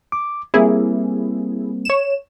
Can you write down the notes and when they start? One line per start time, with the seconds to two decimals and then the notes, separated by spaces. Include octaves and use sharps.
0.12 D6
0.54 G3 A#3 C4 E4 G#4
1.85 C#5 E7